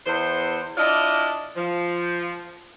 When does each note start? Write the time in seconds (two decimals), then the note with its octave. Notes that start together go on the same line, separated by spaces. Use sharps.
0.06 E2 C5
0.77 D4 E4 F4 D5 D#5
1.56 F3